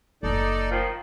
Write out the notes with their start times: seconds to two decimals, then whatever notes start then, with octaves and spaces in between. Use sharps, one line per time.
0.23 F#1 D#4 A4 D5
0.71 D#3 F3